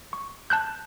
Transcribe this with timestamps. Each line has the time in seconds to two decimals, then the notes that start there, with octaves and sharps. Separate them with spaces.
0.13 C#6
0.50 A5 F#6 G6